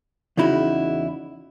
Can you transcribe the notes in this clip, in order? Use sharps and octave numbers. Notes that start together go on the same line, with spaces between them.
E2 C#3 D#4 E4 F#4